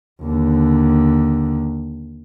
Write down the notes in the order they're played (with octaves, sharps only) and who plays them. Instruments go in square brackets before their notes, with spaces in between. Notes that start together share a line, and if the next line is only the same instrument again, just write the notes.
[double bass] D#2 D3